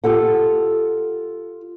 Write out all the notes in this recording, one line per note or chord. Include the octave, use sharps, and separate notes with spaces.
F4 G4 A4 F#5